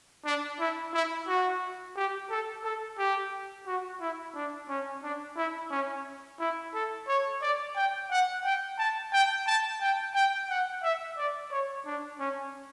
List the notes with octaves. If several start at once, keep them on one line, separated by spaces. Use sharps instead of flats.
D4
E4
E4
F#4
G4
A4
A4
G4
F#4
E4
D4
C#4
D4
E4
C#4
E4
A4
C#5
D5
G5
F#5
G5
A5
G5
A5
G5
G5
F#5
E5
D5
C#5
D4
C#4